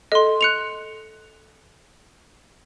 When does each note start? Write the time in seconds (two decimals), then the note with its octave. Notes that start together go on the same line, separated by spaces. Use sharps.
0.12 A4 D#5 C6
0.41 F#6 C#7 F7